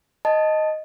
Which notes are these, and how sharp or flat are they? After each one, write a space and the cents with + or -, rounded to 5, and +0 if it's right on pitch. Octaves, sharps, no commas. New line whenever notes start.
D#5 +0 A5 +0